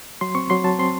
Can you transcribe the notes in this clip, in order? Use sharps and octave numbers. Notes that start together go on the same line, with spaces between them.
F#3 C6
C4 C#6
F#3 C6
F#3 A5
C4 C6